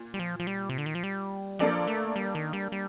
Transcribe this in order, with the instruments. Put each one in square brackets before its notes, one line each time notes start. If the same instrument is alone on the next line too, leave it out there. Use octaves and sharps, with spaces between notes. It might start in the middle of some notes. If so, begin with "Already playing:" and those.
Already playing: [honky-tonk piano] A#2
[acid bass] G3
F3
F3
G3
C3
D3
D#3
F3
G3
[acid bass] F3 [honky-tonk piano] A#3 D4 A4 D5
[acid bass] A3
G3
D#3
G3
G3